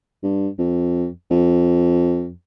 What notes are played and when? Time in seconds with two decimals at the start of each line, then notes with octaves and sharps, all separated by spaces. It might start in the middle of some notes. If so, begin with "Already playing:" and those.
0.23 G2
0.58 F2
1.31 F2